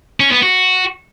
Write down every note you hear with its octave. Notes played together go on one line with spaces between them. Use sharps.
C#4
B3
F#4